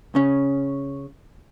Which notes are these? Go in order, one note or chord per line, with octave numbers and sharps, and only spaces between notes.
C#3 C#4